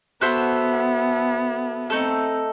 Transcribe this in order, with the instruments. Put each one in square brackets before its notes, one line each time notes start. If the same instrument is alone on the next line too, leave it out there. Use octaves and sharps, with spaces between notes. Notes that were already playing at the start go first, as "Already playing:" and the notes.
[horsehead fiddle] B3 [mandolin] F#4 A4 C5 E5
[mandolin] A3 D#4 A4 [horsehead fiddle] C4